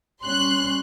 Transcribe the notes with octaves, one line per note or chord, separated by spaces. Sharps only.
G3 C#4 C6 F#6